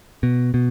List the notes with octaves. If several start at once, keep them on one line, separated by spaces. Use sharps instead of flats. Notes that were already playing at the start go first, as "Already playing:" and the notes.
B2
B2